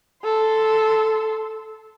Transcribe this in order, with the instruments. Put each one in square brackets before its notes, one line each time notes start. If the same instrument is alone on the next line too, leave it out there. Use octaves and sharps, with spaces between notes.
[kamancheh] A4 C6